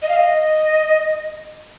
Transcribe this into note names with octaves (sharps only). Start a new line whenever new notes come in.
D#5
F5
D#5